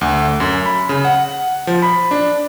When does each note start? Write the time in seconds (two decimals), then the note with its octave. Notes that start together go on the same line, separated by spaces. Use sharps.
0.01 D2
0.40 F#2
0.66 B5
0.89 C#3
1.05 F#5
1.67 F3
1.82 B5
2.11 D4